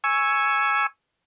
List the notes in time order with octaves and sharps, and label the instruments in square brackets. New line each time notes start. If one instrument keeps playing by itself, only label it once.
[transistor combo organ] G#5 C#6 E6